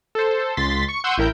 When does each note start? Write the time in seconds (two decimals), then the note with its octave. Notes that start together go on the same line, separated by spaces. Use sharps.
0.15 A4 C5
0.57 C#2 C6 A6 B6
0.88 C#6 C#7
1.04 F#5 C6 C#6 E6 G6 D#7
1.18 A1 E4 A#4 G5 G6